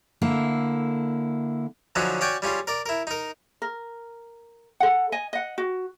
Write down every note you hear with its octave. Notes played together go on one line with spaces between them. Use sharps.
D3 A#3 E4
D3 F3 F#3 C#4 D#4 F#4
C#4 F#4 C#5 D5 G5 G#5
G3 C#4 F4 G#4
A#4 D5
E4 A#4
D#4 A#4
A#4
A4 F#5
D#5 G#5
D#5 F#5
F#4